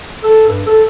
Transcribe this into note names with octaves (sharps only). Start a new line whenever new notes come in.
A4
G2
A4